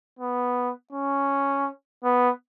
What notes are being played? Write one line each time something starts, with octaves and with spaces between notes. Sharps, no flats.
B3
C#4
B3